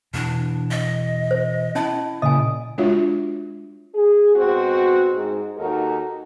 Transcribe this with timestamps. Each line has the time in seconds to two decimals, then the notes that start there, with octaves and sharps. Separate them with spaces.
0.14 B2 E3 D4
0.71 D#5
1.31 C5
1.75 C#4 E4 D#5 A5
2.22 A#2 C#3 D#5 G#5 D#6
2.78 G#3 D4 F4 F#4 C#5 E5
3.95 G#4
4.35 B2 G#3 C4 F#4
5.13 G#2
5.58 D#2 D#4 F#4 G4 A4 A#4